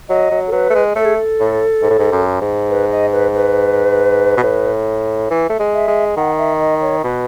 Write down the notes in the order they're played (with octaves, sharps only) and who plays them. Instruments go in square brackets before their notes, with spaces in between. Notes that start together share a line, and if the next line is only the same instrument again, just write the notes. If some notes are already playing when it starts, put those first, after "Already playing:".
[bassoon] F#3 [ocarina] D#5
[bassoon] F#3
[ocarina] A4
[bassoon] F#3 [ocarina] B4
[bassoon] A3
G#3
[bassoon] A3 [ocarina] A4
[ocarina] G#4
A4
[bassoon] A2
G#2
A2
G#2
F#2
G#2
[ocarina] B4
D#5
B4
B4
[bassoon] B2
A2
E3
A3
G#3
[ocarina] E5
[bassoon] G#3
[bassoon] D#3 [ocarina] F#5
[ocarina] E5
D#5
C#5
[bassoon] B2 [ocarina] B4